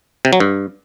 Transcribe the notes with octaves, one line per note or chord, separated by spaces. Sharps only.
C3
F#3
G2